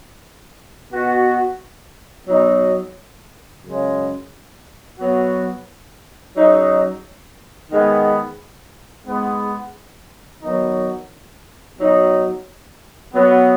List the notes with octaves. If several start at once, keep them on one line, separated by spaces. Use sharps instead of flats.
B2 B3 F#4
B2 F#3 B3 D#4
F#2 C#3 G#3
B2 F#3 B3 F#4
C#3 F#3 D#4
G#2 D#3 G#3 B3
G#2 G#3 B3
D#3 F#3 B3 D#4 F#4
B2 F#3 D#4 F#4
B2 F#3 B3